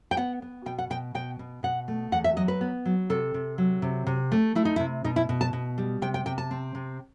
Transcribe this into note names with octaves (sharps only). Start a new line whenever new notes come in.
G5
B3 F#5
B3
B2 G5
F#5
B2 G5
B2 G5
B2
B2 F#5
A3
E2 F#5
E5
F#3 D#5
B4
B3
F#3
C3 A4
C3
F#3
C3
C3
A3
A3 E4
D#4
C3 E4
B2 D#4
E4
B2
A5
B2
G3
C3 G5
G5
C3 G5
A5
C4
C3